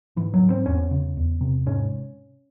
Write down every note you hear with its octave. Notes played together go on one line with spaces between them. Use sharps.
G#2 E3
F#3
G#2
C4
E2 C#4
C#3
E2
C3
G#2 C#4